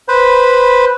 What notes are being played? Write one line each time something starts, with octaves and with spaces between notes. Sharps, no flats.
B4 C5 B5